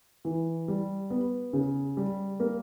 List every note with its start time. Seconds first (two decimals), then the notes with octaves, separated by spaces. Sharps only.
0.25 E3
0.68 G3
1.10 B3
1.53 C#3
1.97 G3
2.40 A#3